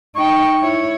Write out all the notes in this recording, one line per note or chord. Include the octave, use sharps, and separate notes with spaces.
D#4 G5 C#6
E4 C#5